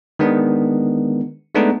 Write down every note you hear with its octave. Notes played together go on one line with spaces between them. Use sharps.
D#3 G#3 B3 D4
G#3 A3 B3 D4 D#4